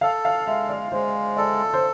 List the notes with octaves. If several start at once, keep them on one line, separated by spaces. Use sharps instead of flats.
A4 F5
F5
G#3 E5
D5
G#3 C5
A4 D5
C5